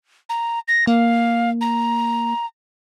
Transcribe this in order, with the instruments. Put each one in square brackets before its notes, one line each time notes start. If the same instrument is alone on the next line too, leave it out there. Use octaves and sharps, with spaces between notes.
[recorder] A#5
A#6
[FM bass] A#3 [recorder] F5
[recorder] A#5